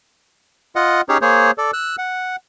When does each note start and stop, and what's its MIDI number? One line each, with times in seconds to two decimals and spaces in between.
0.76 1.01 65
0.76 1.01 75
0.76 1.01 78
1.09 1.18 61
1.09 1.18 63
1.09 1.18 67
1.09 1.18 68
1.09 1.18 73
1.22 1.51 58
1.22 1.51 68
1.22 1.51 72
1.22 1.51 73
1.58 1.71 69
1.58 1.71 74
1.73 1.96 88
1.73 1.96 90
1.98 2.36 78